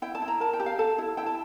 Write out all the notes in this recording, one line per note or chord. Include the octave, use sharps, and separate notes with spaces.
E4 G5
A5
E4
A#5
A#4 A5
G5
G4
F5
A4 A5
E4
E4 G5
A5